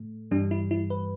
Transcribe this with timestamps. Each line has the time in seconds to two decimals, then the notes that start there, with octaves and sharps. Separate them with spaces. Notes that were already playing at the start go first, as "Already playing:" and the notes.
Already playing: A2 A3
0.31 G2 E3 G3 D4
0.51 E4
0.71 E4
0.90 B4